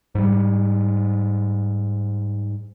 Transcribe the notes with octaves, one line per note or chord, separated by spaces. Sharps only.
G#2 G3